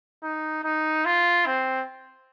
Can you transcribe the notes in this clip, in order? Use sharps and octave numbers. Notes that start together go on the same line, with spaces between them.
D#4
D#4
F4
C4